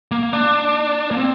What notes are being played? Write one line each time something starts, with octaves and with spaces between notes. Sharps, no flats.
A#3
D4
A#3
C4